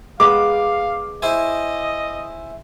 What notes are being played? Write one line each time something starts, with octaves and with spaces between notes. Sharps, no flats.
G#3 B3 F5 D6
E4 C5 D#5 G#5